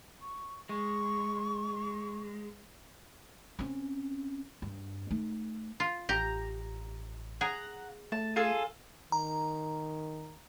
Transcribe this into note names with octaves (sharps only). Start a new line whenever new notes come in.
C#6
G#3 C#6
C4 C#4
G2
A3 D#4
F4
A1 G4 A#5
G#4 F#5 A#5
A3 A5
F4 G#4 A4
D#3 A#5